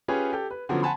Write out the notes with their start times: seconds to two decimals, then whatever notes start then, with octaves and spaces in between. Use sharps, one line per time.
0.08 C#4 F4 G4 G#4 B4 C#5
0.33 G4 A4
0.51 B4
0.69 D3 F3 F#3 B3 C#4
0.82 F#5 G#5 A5 B5 C6